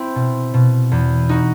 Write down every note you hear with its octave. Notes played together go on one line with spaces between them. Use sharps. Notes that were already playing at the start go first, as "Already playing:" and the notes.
Already playing: C4 E4
B2
B2
E2
D#4 F#4